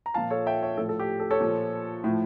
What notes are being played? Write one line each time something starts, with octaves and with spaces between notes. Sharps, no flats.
A#5
A#2 F3 F5 A5
A4 C#5
E5 G5
C#5 E5
A2 F3 A4
A4
G4
A4
A4 C#5
A#2 F3
A2 F3